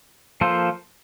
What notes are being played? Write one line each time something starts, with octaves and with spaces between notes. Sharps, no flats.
F3 A#3 F4 A4 C5